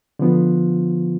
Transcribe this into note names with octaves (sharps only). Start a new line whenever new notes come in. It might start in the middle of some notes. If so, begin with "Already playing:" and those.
D3 F3 B3 F4